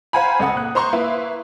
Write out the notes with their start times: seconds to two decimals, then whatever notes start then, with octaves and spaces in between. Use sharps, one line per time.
0.13 C5 F5 F#5 G#5 A#5 B5
0.40 C#2 A4 F#5 D#6
0.55 A#2 F#6
0.75 C5 A#5 C6 C#6
0.93 A#3 E4 B4